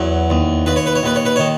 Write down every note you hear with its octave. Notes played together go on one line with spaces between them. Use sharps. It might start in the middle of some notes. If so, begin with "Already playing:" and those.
Already playing: E2 F#3 B4
D#2
D#2 B4
C#5
B4
C#5
D#2 B4
C#5
B4
D#3 C#5